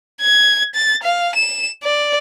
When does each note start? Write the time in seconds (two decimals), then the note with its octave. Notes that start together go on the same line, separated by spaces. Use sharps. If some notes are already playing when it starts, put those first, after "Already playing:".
0.21 G#6
0.75 A6
1.03 F5
1.35 E7
1.83 D5